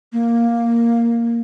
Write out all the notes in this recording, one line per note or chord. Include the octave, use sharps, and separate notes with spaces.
A#3